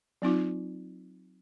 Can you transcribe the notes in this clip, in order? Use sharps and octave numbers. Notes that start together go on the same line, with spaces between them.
F#3 C4 D#4 F4